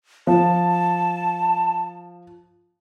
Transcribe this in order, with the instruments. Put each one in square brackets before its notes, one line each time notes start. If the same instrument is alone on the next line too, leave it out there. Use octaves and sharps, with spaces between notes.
[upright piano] F3 [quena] A5